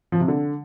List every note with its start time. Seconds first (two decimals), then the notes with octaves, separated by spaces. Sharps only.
0.12 F3
0.20 C3
0.28 D3